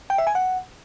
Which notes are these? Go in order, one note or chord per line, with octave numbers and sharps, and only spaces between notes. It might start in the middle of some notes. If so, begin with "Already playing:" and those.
G5
E5
G#5
F#5